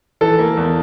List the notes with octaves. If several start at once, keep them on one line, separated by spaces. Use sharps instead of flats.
E3 A4
A#3
E2